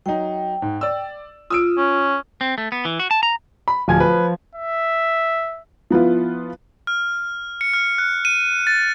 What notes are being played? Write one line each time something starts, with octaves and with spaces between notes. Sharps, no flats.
F#3 D#4 G5
G#2
D5 E6
F4 D#6 E6 D7
C#4
C4
A3
B3
E3
F#4
A5
A#5
B5
D1 F3 G#5 G#6
B4
E5
F3 B3 E4 F4
F6
C#7
F6
F#6
D#7
A6